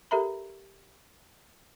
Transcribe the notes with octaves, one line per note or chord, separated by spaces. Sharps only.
G4 A4 A#4 E5 A#5 B5